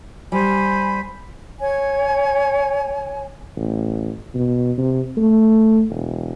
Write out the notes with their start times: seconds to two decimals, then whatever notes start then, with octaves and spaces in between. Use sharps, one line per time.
0.32 G3 C5 G#5 B5
1.60 C#5 G#5
3.56 A1
4.34 B2
4.77 C3
5.17 A3
5.89 E1